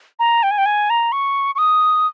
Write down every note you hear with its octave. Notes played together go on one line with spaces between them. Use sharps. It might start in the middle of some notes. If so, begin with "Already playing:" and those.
A#5
G5
G#5
G5
G#5
A#5
C#6
C#6
D#6